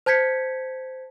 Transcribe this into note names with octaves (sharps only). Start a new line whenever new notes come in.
C5 A5 G6 G#6 B6 C#7